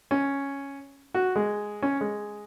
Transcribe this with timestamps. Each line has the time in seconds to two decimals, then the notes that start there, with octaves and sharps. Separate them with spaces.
0.11 C#4
1.14 F#4
1.36 G#3
1.82 C#4
2.01 G#3